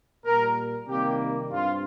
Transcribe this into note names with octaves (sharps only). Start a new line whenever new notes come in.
A#2 G3 A#3 A#4
C3 D#3 G3 A#3 G4
G2 G3 C4 F4